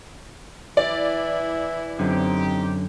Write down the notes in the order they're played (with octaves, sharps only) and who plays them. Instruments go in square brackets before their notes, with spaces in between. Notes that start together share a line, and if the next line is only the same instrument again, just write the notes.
[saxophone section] E3 E4 [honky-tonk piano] D5
[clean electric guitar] F#2 D3 [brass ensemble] C4 D#4 G4